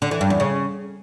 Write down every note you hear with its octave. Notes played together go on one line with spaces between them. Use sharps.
D3
E3
G2
E2
C#3